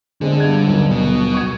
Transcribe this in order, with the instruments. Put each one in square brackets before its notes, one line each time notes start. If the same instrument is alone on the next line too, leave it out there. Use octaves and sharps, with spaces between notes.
[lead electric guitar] D3 [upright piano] G#3 C4 D#5
[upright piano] G2 G#6
D#1 B1
[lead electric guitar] B2
[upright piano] C#6 G#6